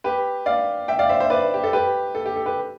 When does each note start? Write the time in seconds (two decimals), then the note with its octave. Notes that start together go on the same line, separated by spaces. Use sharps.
0.04 G4 B4
0.46 D5 F5
0.88 E5 G5
0.99 D5 F5
1.09 C5 E5
1.20 C5 E5
1.30 B4 D5
1.54 G4
1.64 A4
1.73 G4 B4
2.15 A4
2.26 G4
2.36 A4
2.46 G4 B4